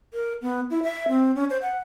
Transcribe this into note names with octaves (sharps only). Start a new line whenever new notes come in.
A#4
B3
E4
E5
C4
C#4
C5
F#5